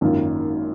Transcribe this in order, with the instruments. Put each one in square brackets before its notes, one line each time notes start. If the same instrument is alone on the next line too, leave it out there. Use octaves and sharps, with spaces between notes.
[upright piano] G#1 F#2 D#3 A#3 F4